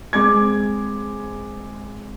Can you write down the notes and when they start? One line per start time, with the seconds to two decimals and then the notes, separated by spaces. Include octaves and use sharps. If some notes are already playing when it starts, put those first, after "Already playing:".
0.13 G#3 C4 D6 G#6